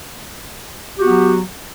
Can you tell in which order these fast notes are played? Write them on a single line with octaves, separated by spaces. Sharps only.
G4 F#4 B3 F#3